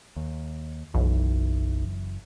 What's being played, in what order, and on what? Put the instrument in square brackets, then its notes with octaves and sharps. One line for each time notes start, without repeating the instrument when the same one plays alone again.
[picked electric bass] D#2
[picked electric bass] F#1 F#2 E3 [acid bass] B1